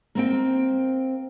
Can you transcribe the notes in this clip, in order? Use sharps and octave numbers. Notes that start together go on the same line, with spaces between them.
A#3 C4 G5